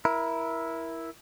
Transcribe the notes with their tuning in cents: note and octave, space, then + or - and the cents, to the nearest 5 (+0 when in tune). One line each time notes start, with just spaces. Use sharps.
E4 +0 A#4 +20